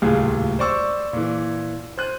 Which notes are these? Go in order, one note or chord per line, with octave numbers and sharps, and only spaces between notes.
D#1 C#2 A2 F4 G#4
C5 D5 C#6 E6
A#2 E3
C5 F#6 D#7